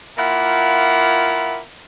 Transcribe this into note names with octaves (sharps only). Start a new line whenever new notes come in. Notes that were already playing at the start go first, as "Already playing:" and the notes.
A#2 A#3 E4 F4 F#5